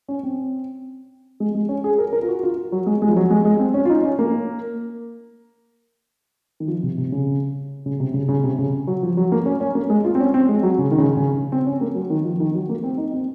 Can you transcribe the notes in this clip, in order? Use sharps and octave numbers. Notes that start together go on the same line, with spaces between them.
C#4
C4
G#3
G#3
C#4
G#4
A#4
A#4
F4
F#4
F4
F#3
G#3
G#3
F3
F#3
G#3
G#3
C4
C#4
F4
D#4
C#4
A#3
D#3
F3
C3
C3
C#3
C#3
C3
C#3
C#3
C3
C#3
F#3
F3
F#3
A#3
C#4
C#4
A#3
G#3
F4
C4
C#4
C4
G#3
F#3
C#3
D#3
C#3
C#3
C4
C#4
A#3
F#3
D#3
F3
D#3
F#3
A#3
C4
D#4
C4